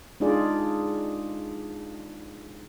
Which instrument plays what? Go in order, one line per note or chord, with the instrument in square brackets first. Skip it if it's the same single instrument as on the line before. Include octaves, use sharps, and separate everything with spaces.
[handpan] G#3 D4 D#4 F4 G#4 D5